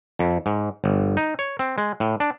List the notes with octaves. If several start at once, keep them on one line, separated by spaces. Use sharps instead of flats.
F2
G#2
G1
D#4
C#5
C4
G#3
A2
D4